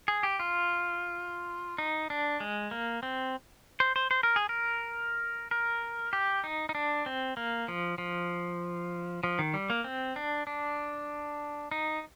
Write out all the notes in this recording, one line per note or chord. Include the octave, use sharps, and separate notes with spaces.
G#4
G4
F4
D#4
D4
G#3
A#3
C4
C5
C5
C5
A#4
G#4
A#4
A#4
G4
D#4
D#4
D4
C4
A#3
F3
F3
F3
D#3
G3
A#3
C4
D4
D4
D#4